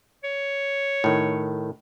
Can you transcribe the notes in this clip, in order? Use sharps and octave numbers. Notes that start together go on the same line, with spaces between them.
C#5
A2 D#3